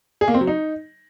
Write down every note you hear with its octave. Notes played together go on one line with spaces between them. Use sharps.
G#4
A#3
C4
F#3
D#4